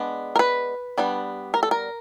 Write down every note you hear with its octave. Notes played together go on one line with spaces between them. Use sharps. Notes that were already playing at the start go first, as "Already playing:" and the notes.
Already playing: G#3 B3 D4
A#4
B4
G3 B3 D4
A#4
A4
A#4